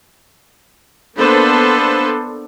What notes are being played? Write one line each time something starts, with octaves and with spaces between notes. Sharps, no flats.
A#3 B3 D4 A4 B4 C5